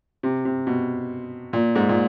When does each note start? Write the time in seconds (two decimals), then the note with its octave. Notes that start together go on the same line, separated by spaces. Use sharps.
0.23 C3
0.45 C3
0.67 B2
1.53 A#2
1.75 G#2
1.89 A#2